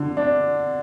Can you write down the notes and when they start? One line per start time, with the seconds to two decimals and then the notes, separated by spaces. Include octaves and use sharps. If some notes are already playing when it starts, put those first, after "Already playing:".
Already playing: D3
0.17 D4